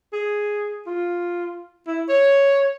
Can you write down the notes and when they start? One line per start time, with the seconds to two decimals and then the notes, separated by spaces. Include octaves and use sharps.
0.13 G#4
0.87 F4
1.87 E4
2.09 C#5